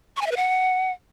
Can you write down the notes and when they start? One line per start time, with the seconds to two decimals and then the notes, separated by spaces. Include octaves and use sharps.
0.16 C#6
0.21 G#5
0.26 E5
0.31 B4
0.36 F#5